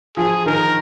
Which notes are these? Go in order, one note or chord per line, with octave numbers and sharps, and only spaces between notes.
F3 G#4
D#3 A#4